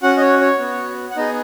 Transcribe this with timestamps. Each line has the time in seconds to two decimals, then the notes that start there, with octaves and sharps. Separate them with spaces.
0.02 C#4 F#4 F#5
0.17 D#5
0.21 C#5
0.41 C#5
0.59 B3 F#4
1.11 F#5
1.16 B3 D#4 G#4 D#5